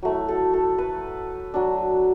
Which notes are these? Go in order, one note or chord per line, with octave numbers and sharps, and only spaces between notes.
F#3 A3 E4
A4
A4
B4
F#3 D4